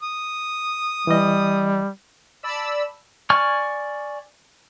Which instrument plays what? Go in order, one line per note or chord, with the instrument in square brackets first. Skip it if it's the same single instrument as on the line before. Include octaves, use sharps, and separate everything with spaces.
[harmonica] D#6
[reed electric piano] E3 D#5 [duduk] G3
[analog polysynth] D5 A5 B5 E6
[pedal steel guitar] D5 G#5 C#6 F6